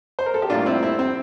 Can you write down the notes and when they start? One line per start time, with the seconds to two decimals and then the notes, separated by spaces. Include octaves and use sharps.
0.19 C5
0.26 A#4
0.34 A4
0.42 G4
0.50 A2 G3 A#3 D4 F4
0.66 C4 E4
0.82 C4 E4
0.99 C4